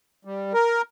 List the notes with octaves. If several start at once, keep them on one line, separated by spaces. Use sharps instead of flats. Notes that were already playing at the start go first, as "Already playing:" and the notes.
G3
A#4